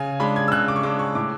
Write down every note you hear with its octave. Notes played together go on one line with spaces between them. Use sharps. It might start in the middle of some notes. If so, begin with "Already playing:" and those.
Already playing: C#3 G#5
G#3 D4 B5
G#6
E6
C#3 F#6
D6
C#6
G#3 D4 D6
C#6
A2 D6